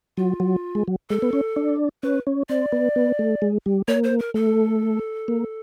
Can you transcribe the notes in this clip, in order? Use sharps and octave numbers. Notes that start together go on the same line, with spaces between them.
F#3 F4
F#3
G#3
F#3
G#3 A4
B3
C#4
D4
C#4 B4
C#4
C4 D5
B3
B3
A3
G#3
G3
A#3 C#5
C5
A#4
A3 A4
A#3